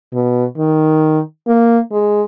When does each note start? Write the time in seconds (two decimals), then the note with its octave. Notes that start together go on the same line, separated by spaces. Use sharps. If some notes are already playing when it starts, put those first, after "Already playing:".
0.13 B2
0.57 D#3
1.47 A#3
1.92 G#3